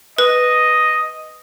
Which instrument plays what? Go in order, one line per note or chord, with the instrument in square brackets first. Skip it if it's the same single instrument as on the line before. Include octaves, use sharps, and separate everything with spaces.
[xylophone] B4 [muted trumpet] D#5